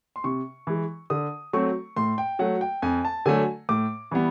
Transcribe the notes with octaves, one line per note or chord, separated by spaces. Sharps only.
C6
C3 C#6
E3 G#3
D3 D#6
F#3 A3 C4 C#6
A2 C6
G5
F#3 A3 F#5
G5
F2 G#5
A5
D3 F#3 A3 G#5
A2 D6
E3 G3 B3